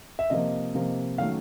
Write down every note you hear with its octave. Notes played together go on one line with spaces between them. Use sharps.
E5
C3 F3 A#3 D#5
C3 F3 A#3
D#3 F#3 A3 C#4 F5